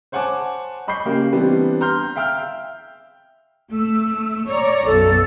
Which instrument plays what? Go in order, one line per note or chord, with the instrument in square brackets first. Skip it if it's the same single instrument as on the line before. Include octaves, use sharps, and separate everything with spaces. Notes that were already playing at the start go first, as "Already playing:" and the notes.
[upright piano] C5 C#5 F#5 G#5 A5 D6
D#5 B5 C#6 G6 C7
C#3 A#3 G4 A#4
E3 G3 B3 C4 D4
A#5 C6 F6 G6
E5 F5 G5 E6 F6 G6
[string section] A3 E6
C#5 D5 A#5
[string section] B1 F#2 [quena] A4